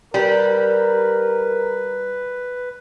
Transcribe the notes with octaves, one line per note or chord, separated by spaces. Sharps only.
G3 A#4 B4